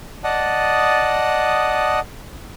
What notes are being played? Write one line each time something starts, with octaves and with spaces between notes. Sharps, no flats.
D5 D#5 F#5 A5 D#6